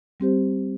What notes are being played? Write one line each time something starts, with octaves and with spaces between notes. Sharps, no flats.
G3 C4 G4 C5